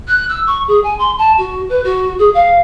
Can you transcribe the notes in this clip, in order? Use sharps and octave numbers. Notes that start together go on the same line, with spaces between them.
F#6
E6
C#6
G#4
G#5
C6
A5
F#4
B4
F#4
G#4
F5